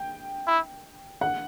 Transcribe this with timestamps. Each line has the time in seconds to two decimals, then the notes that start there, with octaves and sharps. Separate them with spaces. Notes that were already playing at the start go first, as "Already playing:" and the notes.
Already playing: G5
0.48 E4
1.21 F#5